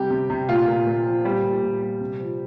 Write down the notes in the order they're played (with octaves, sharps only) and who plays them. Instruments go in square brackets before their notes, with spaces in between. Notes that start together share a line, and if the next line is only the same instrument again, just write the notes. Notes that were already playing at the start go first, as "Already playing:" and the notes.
Already playing: [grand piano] C3 G3 G4
C3
C3
A#2 F4
A#2
A#2
F3
A#2 G3
A#2
A#2
G3
C3
F3